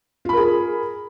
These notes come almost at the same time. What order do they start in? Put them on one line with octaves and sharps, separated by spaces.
F4 B5 A#4 G#4